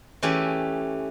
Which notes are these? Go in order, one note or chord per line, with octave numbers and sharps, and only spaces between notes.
E3 A3 C#4 G4 G#5